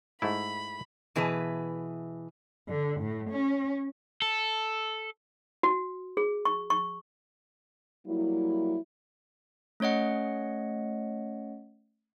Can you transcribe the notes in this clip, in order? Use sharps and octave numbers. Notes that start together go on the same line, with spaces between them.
G#2 A3 E4 B5
B2 E3 G#4 B4 A5
D3
A2
C#4
A4
F#4
G#4
C#6
C#6
F#3 G3 A#3 E4
A3 C#4 C#5 D#5 F#5